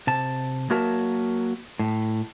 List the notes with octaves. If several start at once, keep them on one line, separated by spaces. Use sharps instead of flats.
C3 A5
F#3 A#3 F#4 A#4 E5 A5
A2